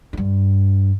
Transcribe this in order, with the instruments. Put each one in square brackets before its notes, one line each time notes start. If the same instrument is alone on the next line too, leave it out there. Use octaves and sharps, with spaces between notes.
[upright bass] G2 E4